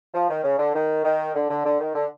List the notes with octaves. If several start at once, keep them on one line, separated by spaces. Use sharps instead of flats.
F3
D#3
C#3
D3
D#3
D#3
D3
D3
D3
D#3
D3